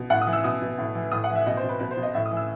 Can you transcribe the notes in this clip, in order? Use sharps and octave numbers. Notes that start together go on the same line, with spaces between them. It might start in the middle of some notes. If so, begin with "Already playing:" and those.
Already playing: B2
A2 F#5
D#6
E3
E6
B2 D#6
B2
A2
E3
A2 D#6
F#5
E3
E5
B2 D#5
C5
B2
B4
B2 B4
C5
B2
D#5
A2 E5
D#6
E3
E6